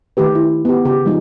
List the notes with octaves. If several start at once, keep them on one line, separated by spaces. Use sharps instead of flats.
D#3 A3 G4 B4
E4
B3 G4
C#3 G4
F3 G3 G#3 D#4